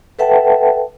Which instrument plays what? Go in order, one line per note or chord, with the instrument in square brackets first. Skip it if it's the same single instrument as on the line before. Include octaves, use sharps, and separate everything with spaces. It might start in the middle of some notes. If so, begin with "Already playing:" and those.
[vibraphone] A4 B4 E5 F#5 G5 A5